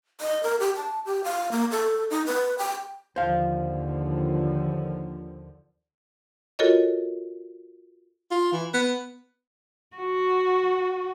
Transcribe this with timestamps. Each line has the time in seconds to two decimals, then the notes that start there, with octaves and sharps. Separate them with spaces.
0.21 D#5
0.43 A#4
0.60 G4
0.76 A5
1.06 G4
1.24 F5
1.52 A#3
1.71 A4
2.10 D#4
2.26 B4
2.58 G5
3.16 D#2 D3 F3 C5 F5
6.59 F4 F#4 A4 A#4 C#5 D#5
8.31 F4
8.53 E3
8.74 B3
9.96 F#4